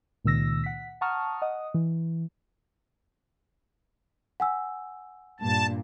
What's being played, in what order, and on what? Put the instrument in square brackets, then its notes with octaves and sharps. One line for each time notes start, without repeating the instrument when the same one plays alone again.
[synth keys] C#2 A#2 D#3 E6 A#6
F#5 B6
F#5 A5 A#5 C#6 D#6 F6
D#5 F#5 D#6
E3
[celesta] F#5 G#5 E6
[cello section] G2 A#2 [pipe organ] A5